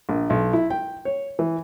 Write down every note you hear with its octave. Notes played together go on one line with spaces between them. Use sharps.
A#1
B1
E4
G5
C#5
E3